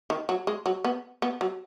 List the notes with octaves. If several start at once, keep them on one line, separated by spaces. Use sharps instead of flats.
D#3
F#3
G#3
F#3
B3
B3
F#3